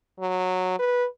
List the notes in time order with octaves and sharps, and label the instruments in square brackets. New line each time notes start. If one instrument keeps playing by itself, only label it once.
[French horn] F#3
B4